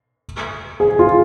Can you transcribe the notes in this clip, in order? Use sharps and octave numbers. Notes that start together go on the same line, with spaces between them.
G#4
F4